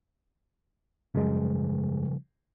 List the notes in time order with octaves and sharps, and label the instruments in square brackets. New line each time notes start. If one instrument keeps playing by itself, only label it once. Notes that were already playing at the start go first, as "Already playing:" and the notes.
[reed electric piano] F#2 G#3 [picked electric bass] C#3 F3 G3